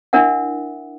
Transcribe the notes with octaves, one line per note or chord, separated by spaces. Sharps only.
D4 E4 A#4 E5 F#5